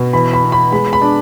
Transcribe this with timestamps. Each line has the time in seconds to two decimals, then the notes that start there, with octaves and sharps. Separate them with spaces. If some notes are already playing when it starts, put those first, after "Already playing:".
Already playing: B2
0.13 E3 B5
0.33 B5
0.43 B3
0.52 B5
0.72 G#3 B5
0.93 B5
1.02 D4